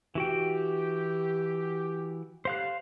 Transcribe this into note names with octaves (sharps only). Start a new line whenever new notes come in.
E3 F#4 G4 G5
D3 G3 G4 C5 F5 F#6